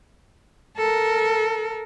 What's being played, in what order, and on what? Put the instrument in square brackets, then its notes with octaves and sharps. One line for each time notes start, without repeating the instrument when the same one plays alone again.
[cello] A4 A#4